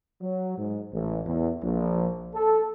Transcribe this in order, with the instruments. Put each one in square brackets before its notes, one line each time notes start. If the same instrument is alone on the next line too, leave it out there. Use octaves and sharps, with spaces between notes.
[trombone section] F#3
G#2
A1
E2
A#1
A4